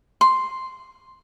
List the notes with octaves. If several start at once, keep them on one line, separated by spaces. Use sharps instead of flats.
C6